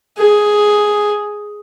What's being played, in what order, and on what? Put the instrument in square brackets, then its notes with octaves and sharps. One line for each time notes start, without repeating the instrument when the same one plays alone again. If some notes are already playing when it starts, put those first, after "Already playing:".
[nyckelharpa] G#4